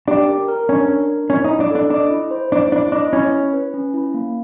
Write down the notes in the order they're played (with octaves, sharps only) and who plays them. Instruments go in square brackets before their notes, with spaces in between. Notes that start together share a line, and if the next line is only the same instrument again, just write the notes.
[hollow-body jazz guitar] D4 [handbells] G4
[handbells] A#4
A#4
[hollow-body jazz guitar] C#4 [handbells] D4
[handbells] A#4
D4
[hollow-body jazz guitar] C#4 [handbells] E4
[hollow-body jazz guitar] D#4
[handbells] E4
[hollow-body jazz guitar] D4
[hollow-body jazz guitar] D4 [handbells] A4
[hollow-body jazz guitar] D4 [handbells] D#5
[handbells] E4
C5
[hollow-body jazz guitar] D4 [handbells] E4
[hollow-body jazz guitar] D4 [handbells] E4
[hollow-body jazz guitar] D4 [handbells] D#5
[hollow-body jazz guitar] C#4 [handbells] E4
[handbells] E4
B4
C#4
E4
A#3